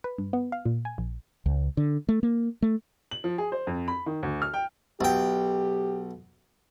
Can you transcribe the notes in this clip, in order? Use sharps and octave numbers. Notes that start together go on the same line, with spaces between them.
B4
G2
B3
F5
A#2
G#5
A#1
C#2
D3
A3
A#3
A3
F#7
F3
G#4
C5
F2
B5
D#3
D2
F6
G5
B1 G4 G5